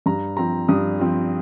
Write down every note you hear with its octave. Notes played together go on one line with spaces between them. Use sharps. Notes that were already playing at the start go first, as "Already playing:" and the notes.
G2 A#5
F3 C4 A#5
G2 D#6
F3 C4